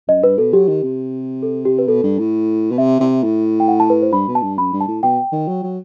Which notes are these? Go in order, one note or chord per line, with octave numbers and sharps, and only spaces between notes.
F#2 D#5
G2 B4
B2 A4
F#3 G4
D#3
C3
A4
G4
B4
B2 A4
G2
A2
B2
C3 E5
C3
A2
G5
F#5
A5
B4
C5
G2 B5
B2
A5
G2
F#2 B5
G2
A5
A2
B2 G5
D#3
F#3
F#3